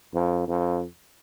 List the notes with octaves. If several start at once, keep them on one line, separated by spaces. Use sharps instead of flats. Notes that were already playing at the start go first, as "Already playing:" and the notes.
F2
F2